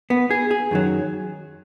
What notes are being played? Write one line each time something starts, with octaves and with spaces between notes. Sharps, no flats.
B3
G#4
G#4
F#2 D#3 F#3